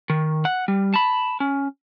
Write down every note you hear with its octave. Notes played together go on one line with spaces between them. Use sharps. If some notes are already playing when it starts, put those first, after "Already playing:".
D#3
F#5
G3
A5 B5
C#4